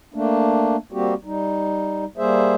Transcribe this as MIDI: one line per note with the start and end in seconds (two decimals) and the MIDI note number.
0.14 0.77 57
0.14 0.77 58
0.14 0.77 62
0.92 1.14 55
0.92 1.14 58
0.92 1.14 60
0.92 1.14 66
0.92 1.14 67
1.25 2.05 55
1.25 2.05 63
2.18 2.55 55
2.18 2.55 58
2.18 2.55 68
2.18 2.55 72
2.18 2.55 76